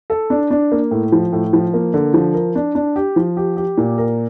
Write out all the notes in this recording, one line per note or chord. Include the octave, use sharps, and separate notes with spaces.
A4
D4
D4
A#3
A2
F3
A2
F3
A#3
D3
F3
A#4
D4
D4
G4
F3
G4
G4
A#2
A#4